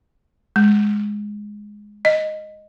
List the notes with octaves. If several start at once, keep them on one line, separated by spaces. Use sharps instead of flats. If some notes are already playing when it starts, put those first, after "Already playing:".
G#3
D#5